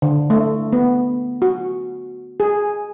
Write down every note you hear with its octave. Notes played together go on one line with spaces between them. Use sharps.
D3
A3
B3
F#4
G#4